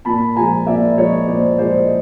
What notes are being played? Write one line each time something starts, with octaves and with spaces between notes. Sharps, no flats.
A#2 A5 B5
F3 G#3 G#5 A#5
A#2 D5 E5
F3 G#3 C#5 D#5
A#2 C5 D5
F3 G#3 C5 D5
D#5